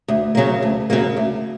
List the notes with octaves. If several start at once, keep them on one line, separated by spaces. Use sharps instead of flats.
D2
C#3 F#3 A#3
D2
C#3 F#3 A#3
D2